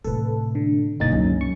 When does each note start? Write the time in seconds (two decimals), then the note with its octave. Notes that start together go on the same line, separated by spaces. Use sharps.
0.04 A2 C3 A4 B4
0.55 D3
1.00 G2 B2 A#3 D4 D#4 D#5 A6
1.12 C#2 D3 F#3 C#4
1.41 C#6